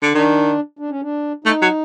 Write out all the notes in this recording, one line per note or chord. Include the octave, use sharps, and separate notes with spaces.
D3
D#3 D4
D4
C#4
D4
A3 D#4
F#3